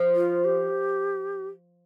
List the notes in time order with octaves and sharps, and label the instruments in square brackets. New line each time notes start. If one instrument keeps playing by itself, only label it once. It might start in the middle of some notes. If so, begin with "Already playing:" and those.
Already playing: [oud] F3
[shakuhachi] F4
G4